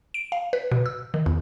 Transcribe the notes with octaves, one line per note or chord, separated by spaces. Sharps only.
D7
F5
B4
B2
E6
D#3
E2